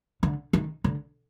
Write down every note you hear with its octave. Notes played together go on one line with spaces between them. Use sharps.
D3
D#3
D3